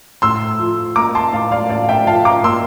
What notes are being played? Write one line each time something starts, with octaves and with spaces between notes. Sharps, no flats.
A2 C6 E6
F3
A#3 A#5 D6
A5 C6
A2 F5 A5
D5 F5
A2 D5 F5
E5 G5
F3 F5 A5
A#5 D6
A#3 C6 E6